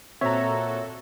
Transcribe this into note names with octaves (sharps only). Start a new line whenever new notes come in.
A#2 C4 F#4 A4 C#5 E5 A#5